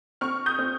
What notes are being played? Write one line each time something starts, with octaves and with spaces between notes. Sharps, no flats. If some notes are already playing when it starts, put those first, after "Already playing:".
C4 C#6 F6
D#6 G6
C4